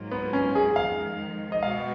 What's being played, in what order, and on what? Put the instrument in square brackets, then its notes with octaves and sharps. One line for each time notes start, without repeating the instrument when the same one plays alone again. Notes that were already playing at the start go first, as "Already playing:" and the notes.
Already playing: [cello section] G#2 F#3 A#3 F4
[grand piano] B3
C#4
G#4
[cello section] F2 D#3 G#3 [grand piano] F5
[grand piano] D#5
[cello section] B2 G#3 B3 F#4 [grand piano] F5